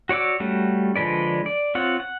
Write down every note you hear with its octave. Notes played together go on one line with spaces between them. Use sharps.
F#4 C#5 D5 D6 E6
G3 A3 C#4 F#4
D3 F3 G#3 B4 D5
D5
C4 F4 C#5 F#5
F#5